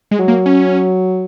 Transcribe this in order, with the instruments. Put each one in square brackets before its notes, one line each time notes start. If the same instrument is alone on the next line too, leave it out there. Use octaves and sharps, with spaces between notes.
[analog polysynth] G#3
[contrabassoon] F#3
[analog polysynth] A#3
C#4